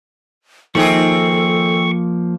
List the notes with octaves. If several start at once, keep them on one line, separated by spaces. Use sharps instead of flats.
D#3 F3 A#3 C4 G#4 A4 C#6